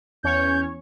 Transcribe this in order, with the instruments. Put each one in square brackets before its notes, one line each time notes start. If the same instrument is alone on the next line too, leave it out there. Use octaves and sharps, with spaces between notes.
[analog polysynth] E2 C#4 C#5 [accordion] G6